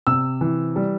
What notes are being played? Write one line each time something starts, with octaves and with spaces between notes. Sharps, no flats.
C3 E6
E3
G3